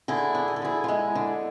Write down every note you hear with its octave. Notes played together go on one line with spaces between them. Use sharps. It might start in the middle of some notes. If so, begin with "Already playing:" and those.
D3 E4 G#4
D4
G#4
A4
D3 E4 G#4
F4
G#3 E4 G#4
D3